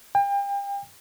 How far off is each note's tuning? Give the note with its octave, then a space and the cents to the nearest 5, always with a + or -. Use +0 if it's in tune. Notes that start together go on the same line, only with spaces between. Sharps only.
G5 +35